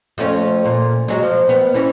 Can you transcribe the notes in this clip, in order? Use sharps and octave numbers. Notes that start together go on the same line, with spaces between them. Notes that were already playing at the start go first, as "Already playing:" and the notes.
F2 A3 C#4
A#2
F#3 G#3
F3
B3
E3 C#4